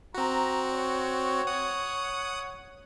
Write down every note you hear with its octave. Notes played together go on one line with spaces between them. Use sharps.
C4 F#4 A#5
C#5
F#5 D#6